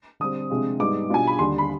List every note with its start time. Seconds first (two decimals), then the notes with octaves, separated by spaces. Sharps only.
0.20 D3 G3 C4 D#6
0.50 C3 F3 G#3 D4 F4
0.80 G#2 G3 B3 D#4 D6
1.10 B2 G3 D4 F4 G#5
1.27 B5
1.39 D#2 D3 G3 C6
1.58 B5